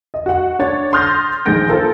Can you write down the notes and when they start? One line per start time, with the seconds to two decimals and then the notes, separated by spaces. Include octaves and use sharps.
0.14 D#5
0.26 F#4 F#5
0.59 D4 C#5 A6
0.93 C6 D#6 F6 G6 A6 A#6
1.46 A#1 D#3 G#3 G6 A#6 D7
1.69 A#3 F4 A4 A#4 C5